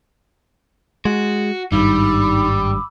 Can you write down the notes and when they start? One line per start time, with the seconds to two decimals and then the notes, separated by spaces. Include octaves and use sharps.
1.05 G#3 F#4
1.72 G#1 G2 G3 D#4 B5 D6 E6